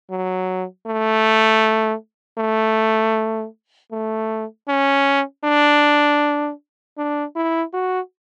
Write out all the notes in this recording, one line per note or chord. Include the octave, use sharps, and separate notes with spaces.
F#3
A3
A3
A3
C#4
D4
D4
E4
F#4